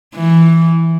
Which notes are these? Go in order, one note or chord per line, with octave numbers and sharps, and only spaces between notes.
E3